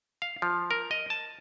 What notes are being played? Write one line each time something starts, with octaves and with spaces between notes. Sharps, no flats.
F5
F3
A#4
D#5
A5